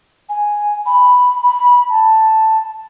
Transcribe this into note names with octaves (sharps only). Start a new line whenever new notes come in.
G#5
B5
B5
A5